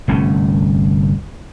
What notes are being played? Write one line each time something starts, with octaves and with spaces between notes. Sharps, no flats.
G1 C2 A3 C#4